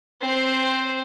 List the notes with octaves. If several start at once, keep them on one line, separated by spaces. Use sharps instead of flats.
C4 C5